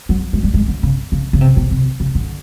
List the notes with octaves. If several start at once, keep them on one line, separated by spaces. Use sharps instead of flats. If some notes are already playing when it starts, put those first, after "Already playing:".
F#3
G#3
G3
G#3
D3
C#3
C#3
C#3
C3
B2
C3
C#3
D3